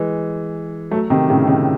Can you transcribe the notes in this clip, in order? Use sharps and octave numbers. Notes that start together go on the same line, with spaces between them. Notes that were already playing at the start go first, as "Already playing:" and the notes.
Already playing: E3 G#3
F#3 A3
C3 D#3
A2 C#3
C3 D#3